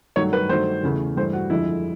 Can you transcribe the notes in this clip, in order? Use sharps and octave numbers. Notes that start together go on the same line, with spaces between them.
G2 D#3 F#3 A3 C#5
B4
G2 D#3 F#3 A3 C5
E2 C#3 E3 A3
G2 E3 A3 C5
F#4
F2 D3 F3 G#3 E4